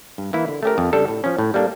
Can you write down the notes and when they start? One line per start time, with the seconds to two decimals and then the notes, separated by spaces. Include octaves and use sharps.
0.18 G2
0.33 E3 A#3 E4
0.48 D3
0.63 A3 C#4 G4 A#4
0.78 F2
0.93 C#3 G3 D4 A4
1.08 A2
1.24 F3 C#4
1.38 A2
1.54 G3 A#3 D4 A4